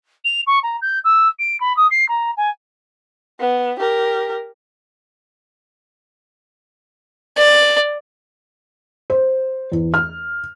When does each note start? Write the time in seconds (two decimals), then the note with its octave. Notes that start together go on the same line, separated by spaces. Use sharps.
0.24 F7
0.47 C#6
0.63 A#5
0.82 G6
1.04 E6
1.39 D7
1.60 B5
1.77 D#6
1.91 C7
2.09 A#5
2.37 G#5
3.40 B3
3.79 G4 A#4
7.38 D5
9.10 C5
9.72 E2
9.94 F6